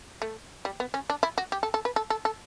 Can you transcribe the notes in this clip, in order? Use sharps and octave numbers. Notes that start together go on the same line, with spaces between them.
A3
G3
B3
C#4
D4
E4
F#4
G4
A4
A4
B4
A4
A4
A4